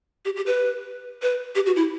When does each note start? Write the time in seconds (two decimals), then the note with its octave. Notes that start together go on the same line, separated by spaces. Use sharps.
0.25 G4
0.36 G4
0.46 B4
1.22 B4
1.55 G4
1.66 F#4
1.76 E4